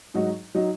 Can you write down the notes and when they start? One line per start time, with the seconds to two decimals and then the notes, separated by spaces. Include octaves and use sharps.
0.14 G#2 F#3 D#4 F#4 D#5
0.55 F#3 D#4 F#4 D#5